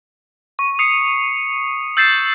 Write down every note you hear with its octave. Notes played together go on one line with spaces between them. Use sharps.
C#6
D#6 C7 C#7
E6 G6 A6 C7 E7